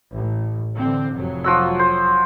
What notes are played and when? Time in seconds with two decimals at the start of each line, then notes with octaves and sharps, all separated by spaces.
0.14 A1
0.74 D3 E3 C4
1.11 F1 F#3
1.44 F3 F#4 E6
1.79 C5